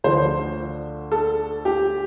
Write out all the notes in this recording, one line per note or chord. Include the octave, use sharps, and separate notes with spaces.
D2 D3 F3 C5
A4
G4